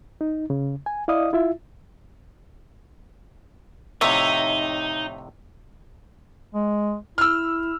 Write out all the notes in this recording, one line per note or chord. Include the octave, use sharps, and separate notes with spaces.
D#4
C#3
G#5
E4 D5 D#5 F5 D#6
E4 F4 E5
F2 A2 C3 D#4 C#5 E5
G#3
E4 E6 F6